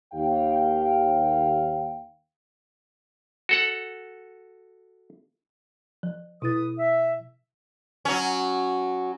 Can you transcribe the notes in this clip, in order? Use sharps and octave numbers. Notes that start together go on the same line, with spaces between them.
D#2 F5 G5
F#4 A4 F#5
F3
B2 E4 B4 D#6 A6
E5
F#3 C#4